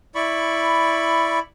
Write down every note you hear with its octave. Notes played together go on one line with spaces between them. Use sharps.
E4 D5 B5 C#6